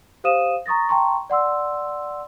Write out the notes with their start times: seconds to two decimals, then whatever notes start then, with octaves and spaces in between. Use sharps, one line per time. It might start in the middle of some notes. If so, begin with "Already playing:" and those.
0.24 G4 C5 F5 D#6 D#7 E7
0.66 A#5 C#6 D#6 A6 A#6
0.89 G5 A5 A#5 C6 C#6
1.30 D5 F#5 C6 E6